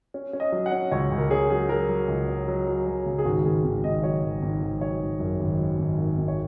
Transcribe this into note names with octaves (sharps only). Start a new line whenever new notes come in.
C#4
C#4
D#5
F#3
F#5
C#4
C#2 C#5
C#2
A#4
C#4 G#4
F#3 G#4
F#3 A#4
F#3
C#2
C#4
F#3
F#3
F#3
C#3
G#4
G#1 F#4
G#1 G#4
G#1
G#1 D#5
F#3 C#5
G#1
G#1
G#1
F#3 C#5
G#1
F#2
G#1
F#3
G#1
G#1
G#1
C#5